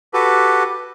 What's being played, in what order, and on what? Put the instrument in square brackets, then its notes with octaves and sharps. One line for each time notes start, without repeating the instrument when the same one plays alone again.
[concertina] F#4 G4 A4 B4